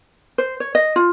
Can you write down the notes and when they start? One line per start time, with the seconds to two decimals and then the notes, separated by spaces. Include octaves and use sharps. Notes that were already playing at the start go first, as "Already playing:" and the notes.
0.38 C5
0.60 C#5
0.75 D#5
0.96 F4